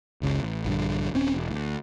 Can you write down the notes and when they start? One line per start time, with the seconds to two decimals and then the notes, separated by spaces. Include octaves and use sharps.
0.22 F#1 C#2 C#3
0.43 A1
0.65 A#1 G2 D3
1.14 D#1 C4 C#4
1.34 E1
1.50 D2